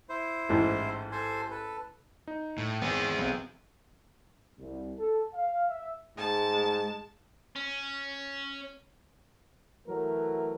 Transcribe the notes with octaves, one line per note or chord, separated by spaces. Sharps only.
E4 C5
A1 G#2
A4 C5 G#5
A4 B4
D#4
A2
G#1 B3 G#4
B1 C4
C2
A4
F5
E5
G#2 G#3 A5
C#4
E3 F#3 A3 A#4